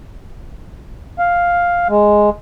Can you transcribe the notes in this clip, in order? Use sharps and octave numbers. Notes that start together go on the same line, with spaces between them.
F5
G#3